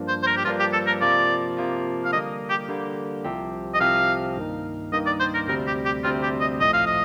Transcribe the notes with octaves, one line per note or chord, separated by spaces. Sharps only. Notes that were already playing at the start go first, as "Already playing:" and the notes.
Already playing: G2 F3 A#3 D4
C5
C5
A#4
G4
G2 F3 A#3 D4 F4
G4
A4
A#4
C3 F3 A#3 F4 D5
C3 F3 A#3 F4
F5
D3 G3 A#3 D#5
G4
D3 G3 A#3
C2 C3 F3 C4 G4
D#5
C2 C3 F3 C4 G4 F5
G2 D#3 A#3 D#4
G2 D#3 A#3 D#4 D#5
D5
C5
A#4
D2 C3 G3 C4 A#4
G4
G4
D2 C3 G3 C4 F4
G4
D#5
A#1 A2 F3 A3 D#5
F5
D#5